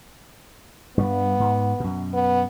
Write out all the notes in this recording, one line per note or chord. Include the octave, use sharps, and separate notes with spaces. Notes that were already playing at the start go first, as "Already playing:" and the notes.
G2 G3 B3
G#2
F#2 B2
B3